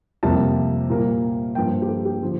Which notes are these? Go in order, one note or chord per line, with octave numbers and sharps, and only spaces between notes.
F2 C3 G3 A#3 A5
A#2 G3 A#3
G2 F3 A#3 G5
G4
A4
G4
D3 F3